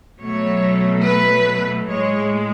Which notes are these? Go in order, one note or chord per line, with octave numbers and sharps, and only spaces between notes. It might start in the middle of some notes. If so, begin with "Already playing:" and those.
B2 F#3 A3 C#5
B4
A2 G#3 C#5